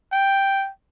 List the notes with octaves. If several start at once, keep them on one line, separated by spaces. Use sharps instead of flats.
G5